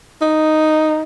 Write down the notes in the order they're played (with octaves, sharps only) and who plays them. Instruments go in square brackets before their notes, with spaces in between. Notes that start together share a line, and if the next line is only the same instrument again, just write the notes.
[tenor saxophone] D#4